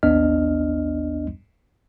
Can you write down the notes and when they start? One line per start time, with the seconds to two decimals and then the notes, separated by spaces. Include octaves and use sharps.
0.03 A1 D#2 B3 D4 D#5 F6